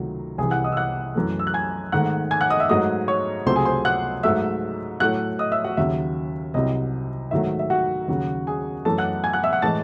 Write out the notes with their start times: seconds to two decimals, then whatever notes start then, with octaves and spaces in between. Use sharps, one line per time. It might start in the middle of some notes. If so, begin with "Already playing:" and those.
Already playing: C#2 C3 D#3 F#3 A3
0.38 C2 C3 E3 G#4 G#5
0.51 F#5 F#6
0.64 D#5 D#6
0.72 E6
0.77 F#5 F#6
1.15 F#2 E3 A3
1.39 E6
1.47 F#6
1.54 G#5 G#6
1.92 G#2 D#3 A3 F#5 F#6
2.31 G#5 G#6
2.41 F#5 F#6
2.50 D#5 D#6
2.60 E5 E6
2.69 G#2 F#3 A3 D#5 D#6
3.08 C#5 C#6
3.46 C#2 C3 F#3 A3 C5 C6
3.56 G#4 G#5
3.65 C5 C6
3.85 F#5 F#6
4.23 G#2 F#3 A3 E5 E6
5.00 A2 F#3 A3 F#5 F#6
5.39 D#5 D#6
5.52 E5 E6
5.64 F#4 F#5
5.77 D#2 C#3 F#3 E5
6.54 C2 C3 F#3 D#5
7.31 G#2 D#3 F#3 A3 E5
7.59 E5
7.70 F#4 F#5
8.08 D#2 C#3 F#3
8.47 G#4 G#5
8.85 F#2 E3 A3 A4 A5
8.98 F#5 F#6
9.24 G#5 G#6
9.33 F#5 F#6
9.44 E5 E6
9.53 F#5 F#6
9.62 A2 E3 G#3 A5 A6